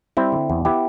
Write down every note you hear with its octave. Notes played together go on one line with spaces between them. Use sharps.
G3 C4 E4
D3
E2
B3 E4 G4